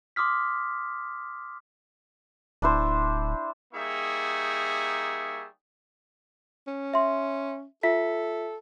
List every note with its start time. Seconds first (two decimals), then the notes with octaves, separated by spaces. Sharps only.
0.16 C6 D6 D#6 F6 B6
2.62 D1 D4 E4 C5
3.74 G3 A#3 D#4 G#4 E5 C#6
6.67 C#4
6.94 E5 C6
7.83 F4 A4 E5 B6